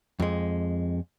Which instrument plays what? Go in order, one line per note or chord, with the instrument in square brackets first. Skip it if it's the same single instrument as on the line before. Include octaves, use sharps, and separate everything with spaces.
[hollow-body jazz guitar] F2 G#3